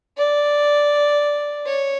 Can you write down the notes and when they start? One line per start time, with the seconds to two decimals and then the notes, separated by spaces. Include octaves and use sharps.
0.17 D5
1.66 C#5